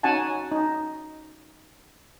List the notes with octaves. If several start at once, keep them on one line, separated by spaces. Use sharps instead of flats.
C#4 D#4 F#4 F#5 G#5 A5
D#4